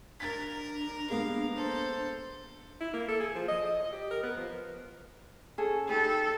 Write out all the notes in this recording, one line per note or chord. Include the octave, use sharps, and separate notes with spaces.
D4 A#4 A6 B6
A#5
G#3 A#3 B3 F5
A4 C5
E4
A#3
A4
G#4
F3
D#5
D#5
D#5
G4
A#4
B3
F3
C#4 G#4 A4
D#4 G4 A4 B4